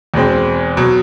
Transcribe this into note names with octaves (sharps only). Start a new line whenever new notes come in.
E2 B2 G#3 C4
B2 F#3